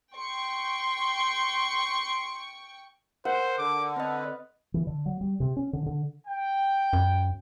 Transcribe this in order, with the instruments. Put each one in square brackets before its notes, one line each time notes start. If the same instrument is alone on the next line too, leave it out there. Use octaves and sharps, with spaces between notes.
[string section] G5 C#6 [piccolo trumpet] C6
[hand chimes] A#4 [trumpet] C5 [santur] F#5
[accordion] D3 [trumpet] D6
[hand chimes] C4 D#5 [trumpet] B4
[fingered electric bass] E3
D3
F#3
G3
C3
C#4
D3
D3
[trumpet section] G5
[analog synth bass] F#2